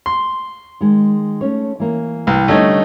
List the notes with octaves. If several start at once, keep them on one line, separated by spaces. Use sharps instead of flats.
C6
D#3 G#3
A3 C#4 C#5
E3 A#3
C2 B4
D3 G3 A3 C#4 D#4 C#5